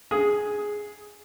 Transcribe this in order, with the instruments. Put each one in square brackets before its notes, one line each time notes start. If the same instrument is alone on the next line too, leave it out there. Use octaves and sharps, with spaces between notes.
[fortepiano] G#4